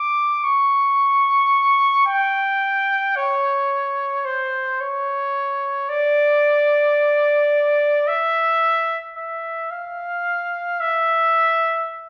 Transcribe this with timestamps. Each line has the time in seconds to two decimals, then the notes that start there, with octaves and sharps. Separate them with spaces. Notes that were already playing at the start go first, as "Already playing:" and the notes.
Already playing: D6
0.44 C#6
2.07 G5
3.16 C#5
4.25 C5
4.80 C#5
5.89 D5
8.07 E5
9.16 E5
9.71 F5
10.80 E5